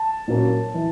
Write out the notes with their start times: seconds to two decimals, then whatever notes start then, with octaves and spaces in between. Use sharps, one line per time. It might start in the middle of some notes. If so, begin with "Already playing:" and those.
Already playing: A5
0.28 A#2 F#3 A#3 C#4
0.74 E3